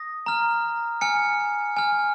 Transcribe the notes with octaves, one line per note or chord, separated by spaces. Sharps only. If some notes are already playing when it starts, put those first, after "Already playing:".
Already playing: D#6 A#6
A#5 F6
G#5 F6 C#7
G#5 F6